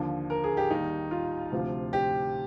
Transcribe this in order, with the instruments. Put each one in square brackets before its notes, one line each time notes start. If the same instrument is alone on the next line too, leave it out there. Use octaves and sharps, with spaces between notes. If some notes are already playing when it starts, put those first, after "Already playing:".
Already playing: [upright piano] D#2 D3 F3
A#4
G#4
G4
D#2 D#3 G3 D#4
F4
D2 C3 F3
G4